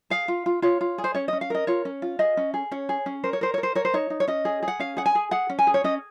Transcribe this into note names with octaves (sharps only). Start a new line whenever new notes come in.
G#4 F5
F4
F4
F4 C#5
F4
G#4
C5
C#4 C#5
D#5
C#4
F5
A#4 D#5
F4 C#5
C#4
F4
G#4 D#5
C#4
G#4
C#4 C#5
G#4
C#4
A#4 C5
C#5
A#4 C5
C#5
A#4
C5
A#4 C#5
C5
D#4 C#5
D#4
C#5
C#4 D#5
G#4
G#4
F#5
C#4 F5
G#4 F#5
G#5
G#4
G#4 F#5
C#4
G#5
G#4
C#5
C#4 D#5